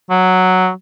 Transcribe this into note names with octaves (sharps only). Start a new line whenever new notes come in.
F#3